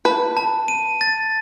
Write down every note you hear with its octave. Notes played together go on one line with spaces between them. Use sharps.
B4 A5
A5
D#7
A6